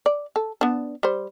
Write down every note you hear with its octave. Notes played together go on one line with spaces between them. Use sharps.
D5
A4
B3 D4
G3 C5